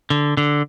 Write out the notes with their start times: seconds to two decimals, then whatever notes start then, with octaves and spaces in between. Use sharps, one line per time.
0.10 D3
0.37 D3